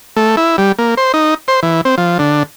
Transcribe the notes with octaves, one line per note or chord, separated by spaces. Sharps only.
A3
E4
G3
A#3
C5
D#4
C5
E3
C4
F3
D3